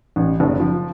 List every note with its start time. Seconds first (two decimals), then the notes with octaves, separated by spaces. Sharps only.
0.16 A1
0.40 F#1
0.60 F3